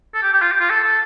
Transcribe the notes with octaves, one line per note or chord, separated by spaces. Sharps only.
A4
G4
G4
F4
G4
F4
A4
A4